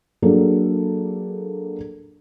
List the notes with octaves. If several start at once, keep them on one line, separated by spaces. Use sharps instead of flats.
F#3 A#3 D4 G#4 A4